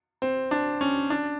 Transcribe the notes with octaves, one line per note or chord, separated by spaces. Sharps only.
C4
D4
C#4
D4